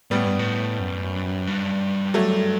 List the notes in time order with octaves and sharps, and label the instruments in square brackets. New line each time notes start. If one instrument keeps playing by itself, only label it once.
[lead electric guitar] A2 [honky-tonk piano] G3 B3
[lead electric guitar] G2
A2
F#2
G2
[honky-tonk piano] F#3 A3